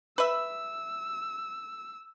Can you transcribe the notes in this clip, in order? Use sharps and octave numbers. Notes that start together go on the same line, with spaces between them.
B4 E5 E6